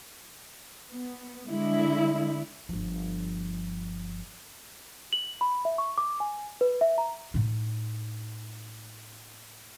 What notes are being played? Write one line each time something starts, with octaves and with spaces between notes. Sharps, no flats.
B3
D3 G#3 E4
G1 F3
F#7
B5
E5
C#6
D6
G#5
B4
E5
A#5
A2 D#4